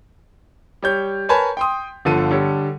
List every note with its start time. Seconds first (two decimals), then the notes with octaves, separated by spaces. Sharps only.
0.82 G3 C#5 G6
1.29 A#4 B4 C#5 G#5 A5 B5
1.57 G5 C6 D#6
2.05 G1 D3 F3 A4 D#7
2.31 D3 G3 A4 C#5